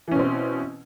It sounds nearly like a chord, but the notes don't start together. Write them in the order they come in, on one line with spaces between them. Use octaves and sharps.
E3 C#4 B2 C4